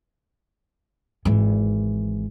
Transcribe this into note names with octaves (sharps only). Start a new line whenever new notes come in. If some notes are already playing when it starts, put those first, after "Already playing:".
G#1 E3